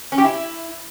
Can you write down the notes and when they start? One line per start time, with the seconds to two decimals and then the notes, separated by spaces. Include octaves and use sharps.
0.12 C#4
0.18 G4
0.24 E4